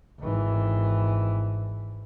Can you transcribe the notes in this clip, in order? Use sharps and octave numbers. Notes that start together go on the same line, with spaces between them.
G#1 E3